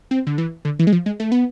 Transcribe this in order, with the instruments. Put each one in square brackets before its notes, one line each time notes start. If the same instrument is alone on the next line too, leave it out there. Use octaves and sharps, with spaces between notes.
[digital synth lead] C4
D3
E3
D3
E3
G#3
F3
G#3
A3
B3